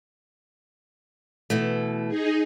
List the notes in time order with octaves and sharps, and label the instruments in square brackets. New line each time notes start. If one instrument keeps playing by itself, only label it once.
[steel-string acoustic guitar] B2 E3 A3
[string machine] D#4 G#4